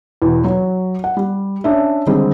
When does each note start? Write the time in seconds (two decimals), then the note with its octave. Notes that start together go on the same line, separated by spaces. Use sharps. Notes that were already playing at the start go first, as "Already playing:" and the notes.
0.22 E2 B2
0.44 F#3
1.04 F#5
1.17 G3
1.64 C#4 D4 E5
2.06 D3 D#3 G3 G#3 C4 D#4